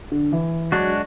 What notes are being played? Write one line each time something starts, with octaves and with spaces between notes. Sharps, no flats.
D3
E3
F#3 G#3 D4 F#4